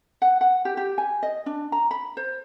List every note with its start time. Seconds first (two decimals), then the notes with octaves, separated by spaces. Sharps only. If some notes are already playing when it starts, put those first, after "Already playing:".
0.22 F#5
0.41 F#5
0.65 G4
0.77 G4
0.98 G#5
1.23 D#5
1.46 D4
1.72 A#5
1.91 B5
2.17 C5